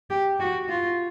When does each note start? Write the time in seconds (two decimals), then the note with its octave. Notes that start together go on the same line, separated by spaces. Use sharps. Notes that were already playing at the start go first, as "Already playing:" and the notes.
0.10 G4
0.40 F#4
0.68 F4